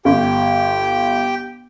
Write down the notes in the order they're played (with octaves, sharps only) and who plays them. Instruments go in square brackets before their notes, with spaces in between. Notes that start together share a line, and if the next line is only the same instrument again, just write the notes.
[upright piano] G1 [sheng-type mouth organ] G4 G5